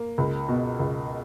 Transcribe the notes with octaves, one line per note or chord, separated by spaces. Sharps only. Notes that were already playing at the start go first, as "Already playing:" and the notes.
Already playing: A#3
C#2
B2
C#2